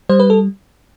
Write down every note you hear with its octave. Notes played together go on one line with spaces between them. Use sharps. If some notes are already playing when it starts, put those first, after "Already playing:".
G3 C5
B4
A4